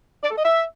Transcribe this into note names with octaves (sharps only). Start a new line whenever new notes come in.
D5
A4
D#5
E5